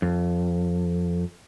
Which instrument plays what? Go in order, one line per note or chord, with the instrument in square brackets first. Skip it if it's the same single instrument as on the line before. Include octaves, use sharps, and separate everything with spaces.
[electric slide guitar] F2